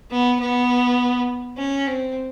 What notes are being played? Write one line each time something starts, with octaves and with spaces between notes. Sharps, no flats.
B3
B3
C#4
C4